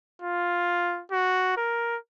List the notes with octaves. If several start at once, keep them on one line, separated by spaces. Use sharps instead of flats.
F4
F#4
A#4